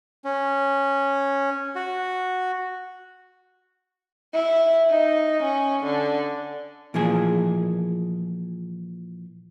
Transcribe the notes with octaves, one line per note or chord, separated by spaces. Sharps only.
C#4
F#4
E4
D#4
C#4
D3
A#2 E3 F3 G#4